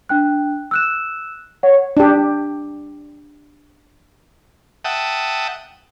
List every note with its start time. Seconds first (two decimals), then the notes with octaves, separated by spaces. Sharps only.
0.09 D4 G5 F#6
0.71 E6 F#6 E7
1.63 C#5 F#5
1.97 D4 G4
4.85 E5 F#5 G5 A5 D#6